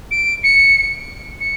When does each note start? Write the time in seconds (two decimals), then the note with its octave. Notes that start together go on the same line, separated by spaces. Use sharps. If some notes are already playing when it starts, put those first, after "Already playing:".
0.11 D7
0.44 C#7
1.40 C#7